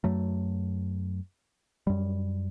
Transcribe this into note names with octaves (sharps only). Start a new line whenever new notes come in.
F#2 F#3 A3
F#2 G3